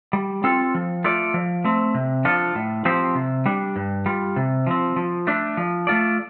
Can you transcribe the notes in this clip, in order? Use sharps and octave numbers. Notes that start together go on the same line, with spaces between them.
G3
C4 F4 A4
F3
A3 F4 A4 D5
F3
A3 C4
C3
F3 D4 F4 A4
A2
F3 C4 G4 C5
C3
G3 D4
G2
G3 F4
C3
F3 C4
F3
A3 D4
F3
A3 F4 A4 D5